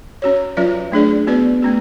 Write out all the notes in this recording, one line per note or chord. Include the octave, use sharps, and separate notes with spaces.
C#4 F#4 C#5
F#3 C#4 F4 B4 D5
A3 D4 G#4 D5
B3 F#4 B4 D5
A3 C#4 F#4